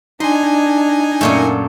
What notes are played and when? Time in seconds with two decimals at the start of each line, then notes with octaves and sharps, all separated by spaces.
0.20 D4 D#4 G#5 C6
1.21 F#2 A#2 A3